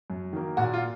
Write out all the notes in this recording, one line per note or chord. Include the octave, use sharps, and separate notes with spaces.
F#2
D#3 F#3 A#3
A#2 F#4
F4